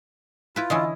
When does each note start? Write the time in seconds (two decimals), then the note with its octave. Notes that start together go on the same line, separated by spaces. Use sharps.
0.56 E4 F4 B4
0.70 D3 E3 C#4 E4 D#5